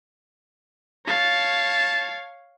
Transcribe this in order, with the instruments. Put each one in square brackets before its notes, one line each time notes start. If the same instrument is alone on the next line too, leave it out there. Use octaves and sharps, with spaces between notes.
[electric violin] C#5 F5 [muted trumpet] A5